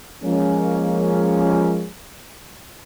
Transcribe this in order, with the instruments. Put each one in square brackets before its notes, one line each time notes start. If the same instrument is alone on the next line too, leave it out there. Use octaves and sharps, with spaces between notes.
[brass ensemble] F3 G#3 A#3 C#4